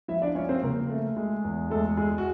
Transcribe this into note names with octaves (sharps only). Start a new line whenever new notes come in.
F3 E4 E5
D4 D5
F3 C#4 C#5
C4 C5
C#3 A#3 A#4
A3
G#3
E2
G#3 A3 A4
G#3 G#4
F#4